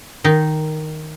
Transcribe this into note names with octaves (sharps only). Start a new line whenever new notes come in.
D#3 D#4